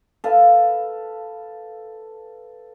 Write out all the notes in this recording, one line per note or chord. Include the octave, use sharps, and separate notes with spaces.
A4 B4 F5